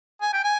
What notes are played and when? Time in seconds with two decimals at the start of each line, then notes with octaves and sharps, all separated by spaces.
0.21 G#5
0.33 G5
0.44 G#5